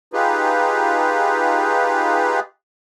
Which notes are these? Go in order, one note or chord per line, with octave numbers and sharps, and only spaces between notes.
D#4 F4 G4 G#4 B4